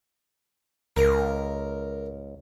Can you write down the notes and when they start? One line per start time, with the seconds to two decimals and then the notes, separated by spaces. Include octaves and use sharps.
0.96 C#2 A#4